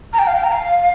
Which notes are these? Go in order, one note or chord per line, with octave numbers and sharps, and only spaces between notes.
A#5
G5
F5
G5
A#5
F5